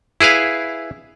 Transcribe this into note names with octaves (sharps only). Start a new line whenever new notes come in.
E4 G#4 B4 F5